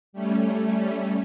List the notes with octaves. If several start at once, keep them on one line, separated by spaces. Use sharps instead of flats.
G3 A3 C#4